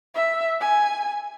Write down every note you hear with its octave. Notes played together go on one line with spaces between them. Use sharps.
E5
G#5